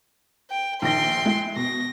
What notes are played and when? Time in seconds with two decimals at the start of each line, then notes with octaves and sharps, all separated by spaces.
0.51 G5
0.82 A#1 D#3 G5 C6 A#6
1.25 G#3 E4
1.56 B2 A#6